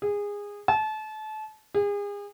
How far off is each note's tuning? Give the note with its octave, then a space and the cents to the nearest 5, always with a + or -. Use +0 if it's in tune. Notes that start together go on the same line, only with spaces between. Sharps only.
G#4 -20
A5 -30
G#4 -35